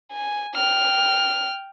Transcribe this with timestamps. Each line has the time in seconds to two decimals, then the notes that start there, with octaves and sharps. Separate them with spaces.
0.12 G#5
0.55 G5 F6